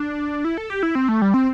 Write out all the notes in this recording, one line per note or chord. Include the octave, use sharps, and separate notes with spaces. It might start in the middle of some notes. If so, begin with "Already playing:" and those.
Already playing: D4
E4
A4
G4
E4
C4
A3
G3
C4